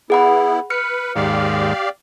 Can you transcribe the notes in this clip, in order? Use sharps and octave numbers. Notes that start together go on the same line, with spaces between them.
B3 E4 G#4 F#5 B5
B4 F6 C#7
D#2 G#2 G4 D5 F5